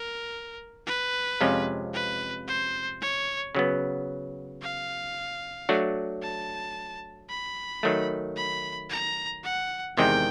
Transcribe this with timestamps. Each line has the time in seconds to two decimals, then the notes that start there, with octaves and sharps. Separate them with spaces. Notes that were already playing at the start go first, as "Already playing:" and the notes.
Already playing: A#4
0.87 B4
1.41 F2 C3 F3 G#3 C#4
1.94 B4
2.48 C5
3.01 C#5
3.55 C#3 F#3 B3
4.62 F5
5.69 F#3 A3 D4 F#4
6.23 A5
7.30 B5
7.83 D#3 F#3 A3
8.37 B5
8.90 A#5
9.44 F#5
9.97 E2 C3 D#3 G#3 C4 G5